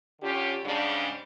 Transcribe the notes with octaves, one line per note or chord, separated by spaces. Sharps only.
D3 C#4 F4 G4
G#2 C#3 G3 D4